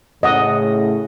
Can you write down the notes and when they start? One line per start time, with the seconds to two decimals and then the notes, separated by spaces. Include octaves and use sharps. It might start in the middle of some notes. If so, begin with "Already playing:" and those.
0.23 A2 C#3 D#5 F#5 D#6